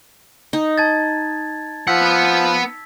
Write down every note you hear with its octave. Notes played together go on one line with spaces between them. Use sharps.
D#4
A5 G#6 A6
F3 B3 F#5 E6 B6